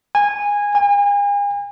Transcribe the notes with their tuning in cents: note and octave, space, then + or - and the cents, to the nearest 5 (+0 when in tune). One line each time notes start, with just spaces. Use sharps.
G#5 -15
G#5 -40